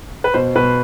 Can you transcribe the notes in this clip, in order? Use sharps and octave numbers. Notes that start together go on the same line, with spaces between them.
B4
B2 C5
B2 B4